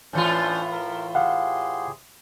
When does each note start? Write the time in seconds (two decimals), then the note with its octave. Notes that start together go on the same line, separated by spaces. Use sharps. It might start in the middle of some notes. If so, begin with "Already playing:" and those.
0.13 A2 E3 C#4 D4 F4 C5
0.71 A#4
1.15 G4 G#4 F5 F#5 C6